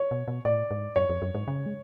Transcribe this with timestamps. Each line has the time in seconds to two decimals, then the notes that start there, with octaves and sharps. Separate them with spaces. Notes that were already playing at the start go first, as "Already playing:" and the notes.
Already playing: C#5
0.11 B2
0.28 B2
0.45 A2 D5
0.71 G#2
0.96 F#2 C#5
1.09 F2
1.22 F#2
1.35 G#2
1.48 C#3
1.66 G#3